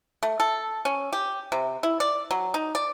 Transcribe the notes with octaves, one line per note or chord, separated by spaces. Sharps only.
A3
A4
C#4
G4
C3
E4
D5
F#3
D#4
D5